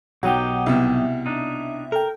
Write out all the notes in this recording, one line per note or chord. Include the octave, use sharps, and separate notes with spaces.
B1 F#3 D#4 G4 F#5 G5
C2 B2 E5
D4 D#4
A4 A#4 G5